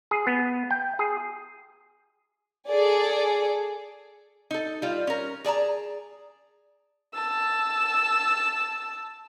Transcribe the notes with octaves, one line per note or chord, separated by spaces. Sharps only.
G#4
B3
G5
G#4
G#4 A4 D5
D#4 A4
G3 F4
C#4 A#4
G#4 D5 A5 A#5
A5 E6